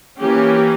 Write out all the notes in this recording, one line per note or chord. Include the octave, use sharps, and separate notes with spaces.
E3 A#3 C#4 G4